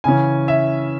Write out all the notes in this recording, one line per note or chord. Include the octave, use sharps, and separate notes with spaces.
C#3 E3 C#4 G#5
E5